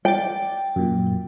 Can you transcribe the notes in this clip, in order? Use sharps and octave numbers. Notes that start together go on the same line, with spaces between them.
D5 G5 A6
F#2 A#2